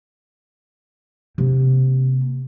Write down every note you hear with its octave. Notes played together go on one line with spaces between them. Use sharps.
C3 A#3